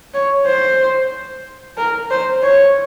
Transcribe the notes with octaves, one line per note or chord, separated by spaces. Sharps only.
C#5
C5
A#4
C5
C#5